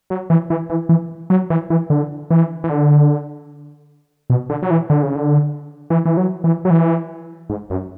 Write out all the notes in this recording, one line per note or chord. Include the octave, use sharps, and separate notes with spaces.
F#3
E3
E3
E3
E3
F#3
E3
E3
D3
E3
E3
D3
B2
D3
F#3
E3
D3
C#3
D3
E3
E3
F#3
E3
F#3
E3
G#2
F#2